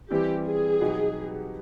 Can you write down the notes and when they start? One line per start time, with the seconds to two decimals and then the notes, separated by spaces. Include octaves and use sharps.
0.10 E3 G3 C4 E4 G4
0.46 G#4
0.80 B2 F#3 B3 D#4 G4